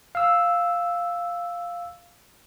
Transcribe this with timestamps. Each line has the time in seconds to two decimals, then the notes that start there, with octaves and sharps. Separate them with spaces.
0.15 F5 E6